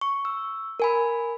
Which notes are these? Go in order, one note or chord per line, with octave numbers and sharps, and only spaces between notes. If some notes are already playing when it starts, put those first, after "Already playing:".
C#6
E6
A#4 G#5 B5